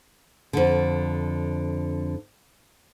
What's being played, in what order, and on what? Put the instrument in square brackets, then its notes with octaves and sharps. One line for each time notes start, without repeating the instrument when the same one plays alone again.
[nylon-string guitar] F2 D3